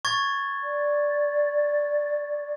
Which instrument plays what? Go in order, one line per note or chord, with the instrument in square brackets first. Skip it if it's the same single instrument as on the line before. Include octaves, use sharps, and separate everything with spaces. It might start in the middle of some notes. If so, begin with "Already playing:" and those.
[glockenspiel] C#6 G#6 A6
[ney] D5